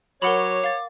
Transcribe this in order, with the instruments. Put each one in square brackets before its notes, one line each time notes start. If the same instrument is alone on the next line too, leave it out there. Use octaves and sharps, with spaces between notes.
[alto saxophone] F#3 [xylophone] A#4 F#5 B5 [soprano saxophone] C#5 [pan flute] D6
[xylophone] F5 A6